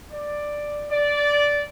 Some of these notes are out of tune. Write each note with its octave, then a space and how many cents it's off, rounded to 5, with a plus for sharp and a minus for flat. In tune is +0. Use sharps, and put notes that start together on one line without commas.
D5 +5
D5 -10